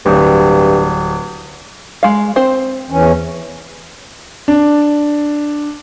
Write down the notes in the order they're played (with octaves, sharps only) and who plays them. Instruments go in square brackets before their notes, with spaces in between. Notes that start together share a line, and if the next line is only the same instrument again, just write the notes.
[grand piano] D1 [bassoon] G2
[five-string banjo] G#3 F5
C4 C5
[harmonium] E2 E3 C#4
[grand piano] D4